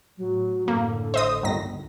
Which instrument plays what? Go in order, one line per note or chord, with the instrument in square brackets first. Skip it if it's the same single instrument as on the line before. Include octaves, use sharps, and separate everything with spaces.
[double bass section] A2 [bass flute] F#3
[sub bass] F#2 [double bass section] A2 D3 [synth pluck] A#3 [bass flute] A4
[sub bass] G#1 [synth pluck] C5 D#5 D#6
[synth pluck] G1 D#3 A#6 [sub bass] C#2